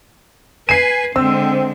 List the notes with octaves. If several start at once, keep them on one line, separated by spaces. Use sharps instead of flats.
B4 G#5 C7 D#7
D3 G#3 C4 E6